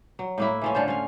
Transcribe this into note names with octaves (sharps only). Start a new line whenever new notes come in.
F#3
A2 A#3 E4
E3 F3 C#4
D3 F4 A4 C5
C#4 F5